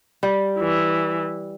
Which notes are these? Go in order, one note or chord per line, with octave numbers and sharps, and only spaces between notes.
G3
E3